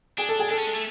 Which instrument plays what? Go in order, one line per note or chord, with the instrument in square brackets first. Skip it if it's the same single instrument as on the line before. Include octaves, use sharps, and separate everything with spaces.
[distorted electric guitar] D4 [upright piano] G#4
[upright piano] A4
G#4
[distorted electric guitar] D4 [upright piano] A4
[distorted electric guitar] C#4
G#3
A3